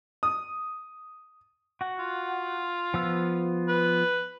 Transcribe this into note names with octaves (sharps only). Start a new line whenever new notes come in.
D#6
F#4 F#5
F4
F3 B3 E6
B4